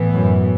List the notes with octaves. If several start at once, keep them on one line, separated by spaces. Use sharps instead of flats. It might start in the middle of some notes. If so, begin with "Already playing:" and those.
Already playing: A2 E3 B3
F#2